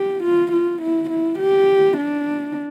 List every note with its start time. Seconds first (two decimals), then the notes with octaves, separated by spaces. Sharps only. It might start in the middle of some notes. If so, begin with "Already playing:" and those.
Already playing: G4
0.23 F4
0.52 F4
0.82 E4
1.10 E4
1.39 G4
1.97 D4